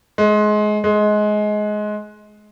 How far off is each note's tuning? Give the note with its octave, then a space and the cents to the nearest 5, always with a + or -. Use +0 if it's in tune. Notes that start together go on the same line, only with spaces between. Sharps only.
G#3 +25
G#3 +20